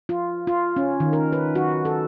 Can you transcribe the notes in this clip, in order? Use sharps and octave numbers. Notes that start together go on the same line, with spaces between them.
F4
F4
C#4
D#3
A#4
B4
F#4
A4